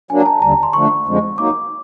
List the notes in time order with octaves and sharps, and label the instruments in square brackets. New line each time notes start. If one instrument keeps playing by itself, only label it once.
[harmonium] F#3 A#3 D4 [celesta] G#5
[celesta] A#5
A5
[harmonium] D#2 D3 G3 [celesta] A#5
[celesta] C6
[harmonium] D3 F3 A3 D4 [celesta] C#6
[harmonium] F2 D3 F3 G#3
[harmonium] F#3 A#3 D#4 [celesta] D6